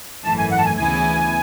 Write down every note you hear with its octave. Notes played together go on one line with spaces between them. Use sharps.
G#1 F#2 E3 A3 A5
G#5
F#5
A5
G#5
D2 C#3 E3 B3 E4 G#5